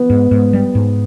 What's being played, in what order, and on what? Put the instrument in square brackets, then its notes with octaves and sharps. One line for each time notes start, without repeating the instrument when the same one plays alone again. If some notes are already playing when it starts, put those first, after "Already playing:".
Already playing: [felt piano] B3
[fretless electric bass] G#2
G#2
G3
G#2